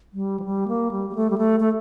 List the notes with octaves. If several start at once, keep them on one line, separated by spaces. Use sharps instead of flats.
G3
F3
G3
A#3
G3
G3
A3
G3
A3
A3